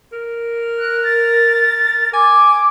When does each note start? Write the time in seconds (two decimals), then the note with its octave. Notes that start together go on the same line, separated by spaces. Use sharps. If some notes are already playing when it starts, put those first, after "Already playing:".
0.12 A#4
0.79 F#6
1.04 A6
2.13 G#5 D6